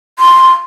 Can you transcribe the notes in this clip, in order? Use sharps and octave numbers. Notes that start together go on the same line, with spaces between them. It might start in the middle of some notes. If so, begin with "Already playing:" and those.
C6